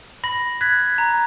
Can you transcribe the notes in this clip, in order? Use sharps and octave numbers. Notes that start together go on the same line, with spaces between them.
B5 A#6
F#6 G#6 B6
A#5